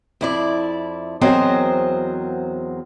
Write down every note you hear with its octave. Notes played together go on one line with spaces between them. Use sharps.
F2 E4 D5
E2 F#3 C4 A#4 C5 D#5